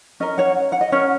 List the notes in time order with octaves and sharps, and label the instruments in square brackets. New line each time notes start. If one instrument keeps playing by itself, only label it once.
[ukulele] C#4 A#4 D#5
C#5 F#5
F#5
D#5
C#4 A#4 C#5 F#5